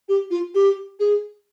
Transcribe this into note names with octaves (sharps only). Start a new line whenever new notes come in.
G4
F4
G4
G#4